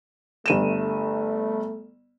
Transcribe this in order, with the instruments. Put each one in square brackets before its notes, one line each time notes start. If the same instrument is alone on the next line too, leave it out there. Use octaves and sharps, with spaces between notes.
[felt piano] G1 D#7 E7 [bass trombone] A3